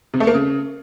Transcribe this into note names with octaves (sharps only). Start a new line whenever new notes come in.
C3
A3
A#3
C#3